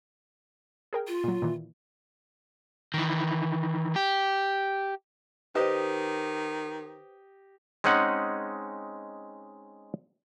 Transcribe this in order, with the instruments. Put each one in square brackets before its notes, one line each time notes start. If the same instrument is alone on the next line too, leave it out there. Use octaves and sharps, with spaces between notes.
[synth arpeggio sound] G#4 A#4 G5
[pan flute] F4
[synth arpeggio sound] A#2 F#3
A#2 D#3 E3
[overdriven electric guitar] D#3 E3
G4
[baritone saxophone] D#3 [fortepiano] G4 D#5 [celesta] B4 C5
[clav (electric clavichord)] G#3 C4 C#4 D#4 F#5